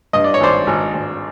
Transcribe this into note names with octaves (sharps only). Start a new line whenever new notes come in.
G2 D#5
D5
C#5
G#1 C5 D5
G#1
G#1